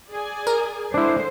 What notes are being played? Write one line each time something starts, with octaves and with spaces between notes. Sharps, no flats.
G#4 D5 G#5
A#4
D3 G#3 D4 E4 C5